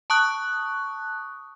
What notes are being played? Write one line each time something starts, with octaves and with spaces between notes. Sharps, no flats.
A5 C#6 D#6 F#6